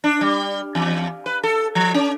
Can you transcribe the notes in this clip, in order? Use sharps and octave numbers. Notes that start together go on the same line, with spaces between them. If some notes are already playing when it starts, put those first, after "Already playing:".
D4
G3
E2
B4
A4
F3
C#4